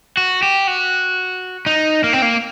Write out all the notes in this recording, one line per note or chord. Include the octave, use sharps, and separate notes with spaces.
F#4
G4
F#4
D#4
A#3
C4
A#3